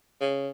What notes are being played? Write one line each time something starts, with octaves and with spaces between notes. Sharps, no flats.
C#3